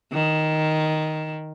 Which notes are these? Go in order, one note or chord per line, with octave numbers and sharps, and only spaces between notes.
D#3